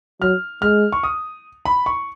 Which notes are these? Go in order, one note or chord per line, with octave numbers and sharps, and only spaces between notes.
F#3 F6
G#3 F6
C#6
D#6
B5
C#6